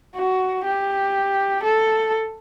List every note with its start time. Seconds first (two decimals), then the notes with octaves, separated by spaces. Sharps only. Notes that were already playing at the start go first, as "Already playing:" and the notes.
0.16 F#4
0.65 G4
1.63 A4